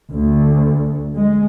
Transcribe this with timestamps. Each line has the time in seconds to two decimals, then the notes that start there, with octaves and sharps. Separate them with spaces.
0.11 D2
1.16 G#3